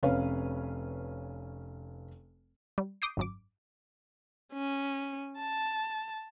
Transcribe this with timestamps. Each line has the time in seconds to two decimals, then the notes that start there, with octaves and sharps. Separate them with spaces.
0.03 F1 C#4 B4 C#5 F5
2.78 G3
3.02 D6 D#6 G6 C7
3.17 G#1 F#2 D6
4.53 C#4
5.38 A5